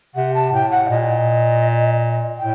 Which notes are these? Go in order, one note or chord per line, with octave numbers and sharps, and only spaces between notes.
C3 F#5
A5
A2 G5
F#5
A#2 D#5
A2 G5